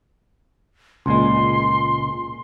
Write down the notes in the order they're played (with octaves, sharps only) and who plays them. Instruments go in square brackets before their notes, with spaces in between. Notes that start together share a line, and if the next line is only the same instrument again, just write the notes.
[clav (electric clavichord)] C#2 A#2 G#3 [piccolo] C6